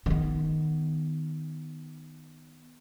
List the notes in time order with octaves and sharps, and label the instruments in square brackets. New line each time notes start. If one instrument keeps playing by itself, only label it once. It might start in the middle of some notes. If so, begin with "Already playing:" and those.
[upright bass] D#3 B3